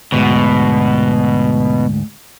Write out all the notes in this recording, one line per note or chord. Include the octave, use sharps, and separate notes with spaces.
D2 G#2 B2